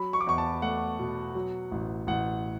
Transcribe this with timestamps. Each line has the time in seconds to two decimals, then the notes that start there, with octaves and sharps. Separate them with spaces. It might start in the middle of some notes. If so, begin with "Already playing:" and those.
Already playing: F#3 B5
0.13 C#6
0.20 D6
0.27 E2 C#6
0.38 A5
0.62 A3 F#5
0.99 B2
1.35 F#3
1.71 A1
2.07 A1 F#5